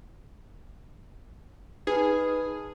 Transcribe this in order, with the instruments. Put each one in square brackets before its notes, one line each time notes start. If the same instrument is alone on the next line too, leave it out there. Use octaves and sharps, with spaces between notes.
[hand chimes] D#4 B4 [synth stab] G#4